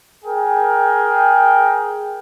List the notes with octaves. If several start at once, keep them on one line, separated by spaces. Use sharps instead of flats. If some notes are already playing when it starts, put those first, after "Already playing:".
G#4 A#4 G5